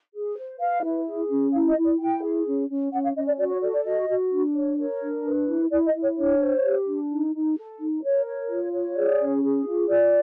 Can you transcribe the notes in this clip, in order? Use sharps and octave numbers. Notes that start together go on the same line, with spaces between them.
G#4
C5
B4 F5
E4
G#4
C#4
E4 F5
D#5
E4
D5
E4 G5
G#4
C#4
C#4
C#4 F#5
F5
C#4 D#5
D5
F#4 D5
C#5
A4 D5
D5
F#4 D#5
F#4
D4
C#5
A#4 C#5
D4
B4
E4
E4 D5
D#5
E4
C#5
D4 C#5
C5
G4
D4
D#4
D#4
A4
D#4
A#4 C#5
C#5
F4
C#5
G#4 D5
C#4
G#4
F4
F4 D5